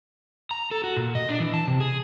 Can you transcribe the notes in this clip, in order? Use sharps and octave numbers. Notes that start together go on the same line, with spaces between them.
A#5
A4
F#4
A#2
D#5
D4
E3
A5
C3
G#4